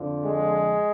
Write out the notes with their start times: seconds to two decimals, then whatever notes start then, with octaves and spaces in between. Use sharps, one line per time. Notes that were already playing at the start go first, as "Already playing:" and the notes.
Already playing: F2 D3 F3
0.23 G#3